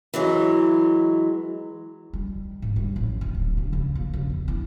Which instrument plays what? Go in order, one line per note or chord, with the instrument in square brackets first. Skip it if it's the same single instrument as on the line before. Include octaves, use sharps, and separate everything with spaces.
[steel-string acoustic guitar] E3 F#3 G#3
[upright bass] G3
G#2
G3
A1
D2
D1
C#3
C#3
A#3
C#3
E2
E4